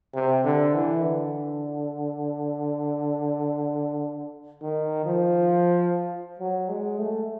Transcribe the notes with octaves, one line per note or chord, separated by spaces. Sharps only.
C3
D3
E3
D3
D#3
F3
F#3
G#3
A3